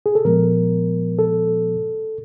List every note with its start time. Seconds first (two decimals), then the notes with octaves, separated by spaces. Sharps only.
0.06 G#4
0.15 A4
0.25 A#2 F3 G#3 B3 A#4
1.19 A4